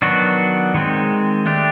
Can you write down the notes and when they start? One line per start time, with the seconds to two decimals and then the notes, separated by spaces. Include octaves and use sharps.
0.02 D#3 F#3 B3 D4 F#4
0.74 D#3 G#3 C4
1.46 A3 D4 G4